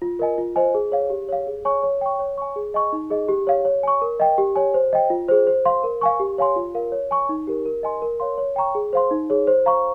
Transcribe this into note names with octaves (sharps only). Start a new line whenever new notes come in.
F4
A#4 D#5 G#5
F4
C5 D#5 G#5
G#4
C#5 F5
G4
C#5 F5
G#4
C#5 G#5 C#6
C#5
G5 C#6
C#5
G#5 C#6
G#4
D#5 G#5 C#6
D#4
G#4 D#5
G4
C#5 F5
C#5
G#5 C#6
A#4
D#5 G5
G4
C#5 G#5
C5
D#5 G5
F4
G#4 C5
C5
F5 C6
A#4
F5 G#5 C#6
G4
C#5 F5 G#5 C6
F4
A#4 F5
C#5
G#5 C#6
D#4
G4 A#4
A#4
D#5 G#5 C6
A#4
C#5 F5 C6
C#5
G5 A#5 C#6
G#4
C5 F5 C6
D#4
G#4 C#5
C5
F5 A#5 C#6